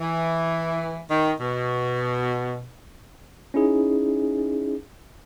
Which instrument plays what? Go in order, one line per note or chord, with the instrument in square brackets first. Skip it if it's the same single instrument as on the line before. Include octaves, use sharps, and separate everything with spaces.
[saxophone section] E3
D#3
B2
[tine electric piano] C#4 D#4 E4 G#4